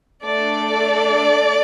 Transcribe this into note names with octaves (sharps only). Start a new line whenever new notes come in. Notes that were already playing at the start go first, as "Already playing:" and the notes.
A3 D4 A4 D5